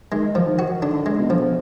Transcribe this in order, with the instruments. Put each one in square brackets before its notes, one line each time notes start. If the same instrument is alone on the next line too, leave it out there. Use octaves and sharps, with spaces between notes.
[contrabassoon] D#3 [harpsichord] G#3
[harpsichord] F3
[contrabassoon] D#3
[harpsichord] F#4
[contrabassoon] D3 [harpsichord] D4
[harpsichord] G#3
[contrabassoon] B2
[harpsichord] F3